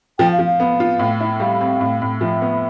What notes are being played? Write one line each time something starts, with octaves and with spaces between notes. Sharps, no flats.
F3 G5
F5
F3
F5
B3
F4
A2
E4
G3 F5
C4
A2
A2
F3 E5
B3